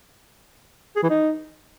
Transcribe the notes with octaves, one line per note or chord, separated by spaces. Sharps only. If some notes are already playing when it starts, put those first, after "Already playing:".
G#4
E3
D#4